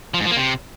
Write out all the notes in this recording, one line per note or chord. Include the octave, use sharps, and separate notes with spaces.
F3
G#2
F3
A#3
C3